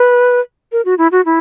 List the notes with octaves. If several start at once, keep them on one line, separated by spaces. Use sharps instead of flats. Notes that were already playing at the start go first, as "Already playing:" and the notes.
Already playing: B4
A#4
F#4
E4
F#4
E4